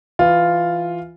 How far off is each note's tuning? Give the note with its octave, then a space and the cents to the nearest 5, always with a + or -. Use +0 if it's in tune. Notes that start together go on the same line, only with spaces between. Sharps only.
E3 +15 F4 +0